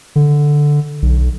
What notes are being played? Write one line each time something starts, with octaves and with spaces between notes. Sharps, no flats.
D3
B1